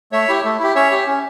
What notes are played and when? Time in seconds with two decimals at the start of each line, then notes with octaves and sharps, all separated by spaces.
0.12 A3 C#5 E5
0.28 E4 G4
0.44 A3
0.60 E4 G4
0.75 C#4 C#5 E5
0.91 G4
1.07 C#4